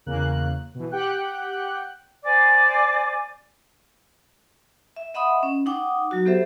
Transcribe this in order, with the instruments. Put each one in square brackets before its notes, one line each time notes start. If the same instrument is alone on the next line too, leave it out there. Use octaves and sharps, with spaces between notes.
[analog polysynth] E2 C#3 A#3 F#6
B2 E3
G4 F#5 G5 F#6
[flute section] C5 D5 G#5 D6
[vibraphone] E5
D#5 E5 F#5 B5 C6 D#6
C#4
D#4 F#5 G5 D6 D#6
F#3 F#4
B3 G4 A4 C5 E5